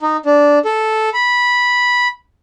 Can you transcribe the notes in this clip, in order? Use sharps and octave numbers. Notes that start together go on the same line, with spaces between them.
D#4
D4
A4
B5